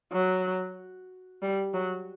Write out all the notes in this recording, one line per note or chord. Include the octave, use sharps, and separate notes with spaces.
F#3
G3
F#3